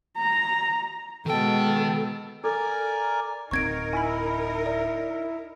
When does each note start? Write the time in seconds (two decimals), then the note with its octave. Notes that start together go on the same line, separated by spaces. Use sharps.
0.17 A#5
1.26 B2 D#3 G#3 A4 G5
2.44 A4 A#4 D5 G#5
3.51 D1 C4 D#4 A#4 C#6 G#6 D7
3.93 E4 G#5 B5
4.66 D5